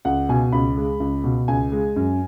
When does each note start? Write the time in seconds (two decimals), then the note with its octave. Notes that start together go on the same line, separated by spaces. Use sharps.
0.05 C#2 F#5
0.29 B2 G#5
0.52 C#2 B5
0.77 G#3
1.00 C#2
1.24 B2
1.48 C#2 G#5
1.72 G#3
1.96 F#2